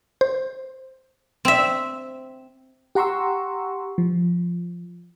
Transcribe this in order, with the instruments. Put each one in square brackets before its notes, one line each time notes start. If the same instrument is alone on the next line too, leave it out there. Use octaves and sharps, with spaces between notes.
[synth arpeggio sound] C5
[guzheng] C4 E5
[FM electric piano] G4 F#5 A#5 C6 C#6 E6
F3